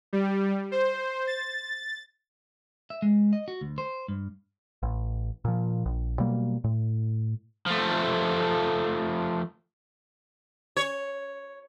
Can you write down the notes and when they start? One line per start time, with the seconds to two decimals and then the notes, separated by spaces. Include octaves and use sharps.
0.13 G3
0.72 C5
1.27 A6
2.90 E5
3.02 G#3
3.33 D#5
3.48 F#4
3.61 D2
3.78 C5
4.08 G2
4.83 A1
5.45 A#2 F3
5.85 A#1
6.20 B2 F#3 G3 A#3
6.64 A2
7.66 F3 A3
10.77 C#5